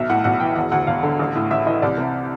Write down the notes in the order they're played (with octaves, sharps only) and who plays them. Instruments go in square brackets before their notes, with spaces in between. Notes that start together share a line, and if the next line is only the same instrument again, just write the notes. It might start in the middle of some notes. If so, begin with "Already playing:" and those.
Already playing: [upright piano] B1 E5
A2 F#5
B1 F#5
E3 G5
E1 F#5
D2 F#5
E1 F5
D3
A1
A2
A1 E5
E3 D#5
C2 D5
C3